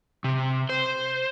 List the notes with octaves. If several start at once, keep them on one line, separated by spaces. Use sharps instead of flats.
C3
C5